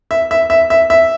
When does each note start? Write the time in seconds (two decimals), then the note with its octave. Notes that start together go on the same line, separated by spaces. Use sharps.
0.11 E5
0.31 E5
0.50 E5
0.70 E5
0.90 E5